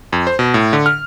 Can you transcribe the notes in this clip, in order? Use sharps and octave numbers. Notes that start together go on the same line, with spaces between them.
F2
C5
B2
A2
D3
F6